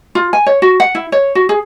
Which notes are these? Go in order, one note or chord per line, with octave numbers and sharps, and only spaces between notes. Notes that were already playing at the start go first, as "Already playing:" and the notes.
F4
G#5
C#5
F#4
F#5
E4
C#5
F#4
G#4